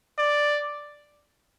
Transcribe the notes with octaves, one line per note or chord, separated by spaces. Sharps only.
D5